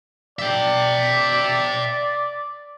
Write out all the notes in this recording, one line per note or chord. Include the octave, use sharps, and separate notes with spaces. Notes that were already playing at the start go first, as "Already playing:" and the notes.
D5 E5 G5